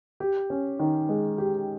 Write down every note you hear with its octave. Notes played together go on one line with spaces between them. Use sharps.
G4
C#4
D#3
G#3
G4